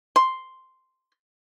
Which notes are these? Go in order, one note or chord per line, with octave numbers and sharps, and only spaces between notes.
C6